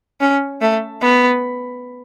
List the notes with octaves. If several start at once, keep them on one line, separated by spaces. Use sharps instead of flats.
C#4
A3
B3